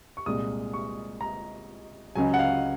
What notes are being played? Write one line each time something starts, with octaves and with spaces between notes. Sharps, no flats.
C#6
C2 A#2 G#3 D#6
C#6
A#5
C#2 C#3 F#3 G#5
F#5
F5